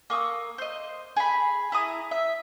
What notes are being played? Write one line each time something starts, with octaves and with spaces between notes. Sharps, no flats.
A#3 C#6 D#6 E6
C5 D#5
G#4 B5
E4 A#5 D#6
E5